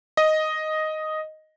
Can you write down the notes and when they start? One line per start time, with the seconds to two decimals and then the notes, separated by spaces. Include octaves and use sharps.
0.17 D#5